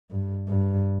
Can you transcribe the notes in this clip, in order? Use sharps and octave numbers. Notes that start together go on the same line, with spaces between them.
G2
G2